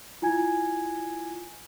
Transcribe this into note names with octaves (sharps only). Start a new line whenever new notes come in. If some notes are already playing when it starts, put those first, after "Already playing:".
E4 F4 G#5 G#6